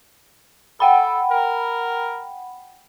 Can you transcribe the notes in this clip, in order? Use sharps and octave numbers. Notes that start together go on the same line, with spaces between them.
A4 F#5 G5 B5
A#4